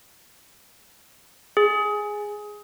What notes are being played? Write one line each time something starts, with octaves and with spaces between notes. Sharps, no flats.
G#4